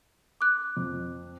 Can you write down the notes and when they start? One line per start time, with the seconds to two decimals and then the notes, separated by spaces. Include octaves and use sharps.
0.41 D6 F#6
0.77 F2